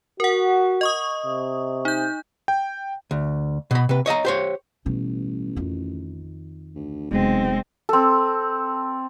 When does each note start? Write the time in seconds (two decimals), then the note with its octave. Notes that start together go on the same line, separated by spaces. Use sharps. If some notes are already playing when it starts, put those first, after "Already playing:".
0.20 F#4 A#4 F#5
0.81 D#5 C#6 D#6
1.25 C3
1.85 D#4 G6
2.48 G5
3.11 D2
3.71 B2 B5
3.89 C3 B4
4.06 C#5 D#5 E5 A#5
4.25 G4 C5 C#5
4.86 A1 B2 G3
5.56 F2 D#3
6.75 D2
7.11 F1 B1 G#3 C4
7.89 C4 A4